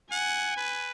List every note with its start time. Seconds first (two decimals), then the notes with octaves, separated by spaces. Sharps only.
0.11 F#5 G#5
0.57 B4